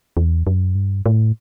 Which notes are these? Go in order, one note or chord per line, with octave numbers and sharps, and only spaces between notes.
E2
F#2
G2
A2